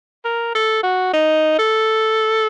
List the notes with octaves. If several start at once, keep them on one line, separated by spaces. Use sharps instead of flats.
A#4
A4
F#4
D#4
A4